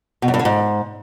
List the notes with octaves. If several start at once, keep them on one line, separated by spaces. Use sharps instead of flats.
B2
F#2
G2
D3
G#2